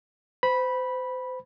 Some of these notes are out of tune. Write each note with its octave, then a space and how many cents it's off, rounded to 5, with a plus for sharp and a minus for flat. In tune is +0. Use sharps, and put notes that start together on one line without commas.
C5 -35 B5 -10